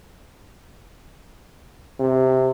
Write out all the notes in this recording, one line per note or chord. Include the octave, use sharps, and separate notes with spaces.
C3